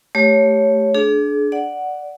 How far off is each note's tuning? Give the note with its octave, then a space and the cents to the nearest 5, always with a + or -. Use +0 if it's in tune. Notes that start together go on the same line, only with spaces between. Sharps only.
A3 +0 G4 +0 C#5 +0
D4 +0 G#4 +40
D5 +0 F#5 +0